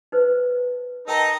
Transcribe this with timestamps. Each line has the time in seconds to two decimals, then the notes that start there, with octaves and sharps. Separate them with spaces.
0.12 D#4 B4 C5
1.08 D#4 A#4 D#5 G5 A5 A#5